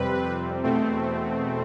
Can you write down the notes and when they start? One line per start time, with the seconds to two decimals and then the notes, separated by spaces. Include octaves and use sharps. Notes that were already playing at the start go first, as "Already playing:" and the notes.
Already playing: F2 C3 G3 C4 B4
0.64 E2 B2 A3 C4